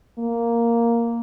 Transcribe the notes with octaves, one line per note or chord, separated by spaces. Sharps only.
A#3